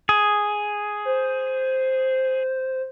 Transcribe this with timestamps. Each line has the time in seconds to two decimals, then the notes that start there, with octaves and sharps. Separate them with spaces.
0.09 G#4
1.05 C5